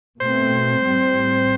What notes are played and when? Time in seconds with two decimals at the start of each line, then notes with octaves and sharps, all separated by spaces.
0.20 B2 A3 C4 C5
0.84 A2 G3 C4